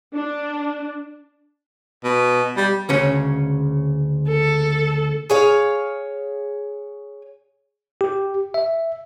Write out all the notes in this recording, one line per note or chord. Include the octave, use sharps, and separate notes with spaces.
D4
B2
G3
D2 C#3 C#4
A4
G#4 C#5 F5
G4
E5